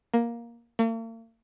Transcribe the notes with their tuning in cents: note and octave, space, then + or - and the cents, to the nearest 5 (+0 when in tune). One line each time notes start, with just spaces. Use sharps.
A#3 +10
A#3 -45